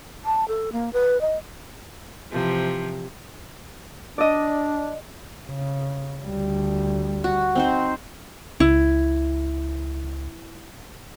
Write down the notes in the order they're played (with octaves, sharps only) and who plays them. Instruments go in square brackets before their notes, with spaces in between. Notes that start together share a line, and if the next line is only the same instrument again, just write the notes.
[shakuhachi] A5
A4
A#3
B4
D#5
[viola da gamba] C3 E3 F3
[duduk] D4 [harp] D5 D#5
[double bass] C#3
D2 G3
[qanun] F#4
C4 D#4 C5
[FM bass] C#2 [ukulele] E4